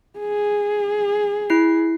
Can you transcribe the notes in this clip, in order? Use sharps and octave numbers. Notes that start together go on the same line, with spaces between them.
G#4
E4 C7